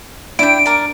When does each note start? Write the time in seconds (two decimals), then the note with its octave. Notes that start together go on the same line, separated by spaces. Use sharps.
0.39 D4 E4 G5 D7
0.66 A#4 D5